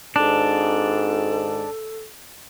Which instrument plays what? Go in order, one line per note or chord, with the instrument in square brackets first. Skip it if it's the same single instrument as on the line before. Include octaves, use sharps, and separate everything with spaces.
[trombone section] G#1 G#2 [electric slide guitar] D4 [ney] A4